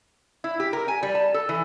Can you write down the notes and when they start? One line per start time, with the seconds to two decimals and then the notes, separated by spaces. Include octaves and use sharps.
0.44 E4
0.60 G4
0.73 A#4
0.88 G#5
1.03 G3
1.15 A5
1.34 A4
1.49 E3